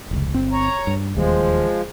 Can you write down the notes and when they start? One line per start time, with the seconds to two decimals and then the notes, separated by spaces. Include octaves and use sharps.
0.11 F1 C#2
0.33 G1 C4
0.52 C#5 A#5
0.87 G2
1.15 E1 D#2 F3 G3 G#3